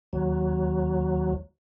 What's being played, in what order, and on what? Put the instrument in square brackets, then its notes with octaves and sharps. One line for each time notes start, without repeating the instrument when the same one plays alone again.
[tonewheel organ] D#2 F#3